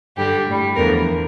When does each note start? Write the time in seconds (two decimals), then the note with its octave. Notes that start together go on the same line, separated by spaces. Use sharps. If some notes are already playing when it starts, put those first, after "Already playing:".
0.17 G2 D3 G3 G4
0.47 A2 G3
0.76 E2 D3 F3 A#4